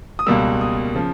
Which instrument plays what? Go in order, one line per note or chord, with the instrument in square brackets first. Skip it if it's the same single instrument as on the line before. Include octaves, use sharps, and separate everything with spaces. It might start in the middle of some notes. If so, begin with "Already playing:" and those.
[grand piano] D#6
C#2 B2 G3 A#3 E6
D#6
C#3 F3